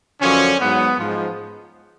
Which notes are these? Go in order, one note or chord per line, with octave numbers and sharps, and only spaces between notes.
F#2 D3 F3 C#4
G#2 F#3 B3
G#2 F3